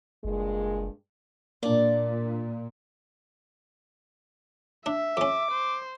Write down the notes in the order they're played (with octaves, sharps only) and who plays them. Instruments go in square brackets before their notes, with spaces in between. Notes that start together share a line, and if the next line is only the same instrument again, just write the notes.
[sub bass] F#1 [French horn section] G2 A#2 G#3
[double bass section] A#2 [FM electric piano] A#3 D4 [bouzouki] D5
[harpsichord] D4 [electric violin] E5
[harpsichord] F2 C#4 [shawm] D6
[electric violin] C5